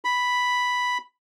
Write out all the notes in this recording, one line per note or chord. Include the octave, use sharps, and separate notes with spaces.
B5